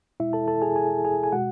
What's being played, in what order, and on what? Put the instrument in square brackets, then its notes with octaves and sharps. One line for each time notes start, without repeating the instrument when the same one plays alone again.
[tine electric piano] B2 G#3 E4 E5
A4 A5
A4 A5
G#4 G#5
G#4 G#5
G#4 G#5
G#5
B2 G#3 F#4 F#5